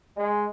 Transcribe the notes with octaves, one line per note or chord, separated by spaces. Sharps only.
G#3